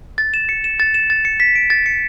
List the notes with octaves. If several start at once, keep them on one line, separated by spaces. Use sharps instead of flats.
A6
E7
C#7
E7
A6
E7
A6
C#7
B6
D7
A6
C#7